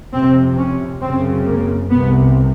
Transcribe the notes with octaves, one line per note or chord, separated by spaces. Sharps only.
F2 C3 C4
C#4
F#2 C#3 C4
A#3
C2 C3 B3